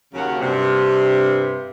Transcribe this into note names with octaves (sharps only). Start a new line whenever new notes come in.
D#2 C#3 F#3 A#3 F#5
G2 C3